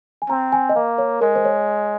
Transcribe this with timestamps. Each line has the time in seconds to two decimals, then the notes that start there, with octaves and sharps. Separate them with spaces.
0.22 G#5
0.30 C4 A#5
0.52 G#5
0.69 D#5
0.75 A#3 F5
0.98 C#5
1.21 G#3 A#4
1.35 C5
1.45 C#5